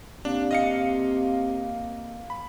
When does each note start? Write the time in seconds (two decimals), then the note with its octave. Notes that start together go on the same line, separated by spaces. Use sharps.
0.25 C3 A#3 D4
0.51 D#5 F5 C#7
2.30 B5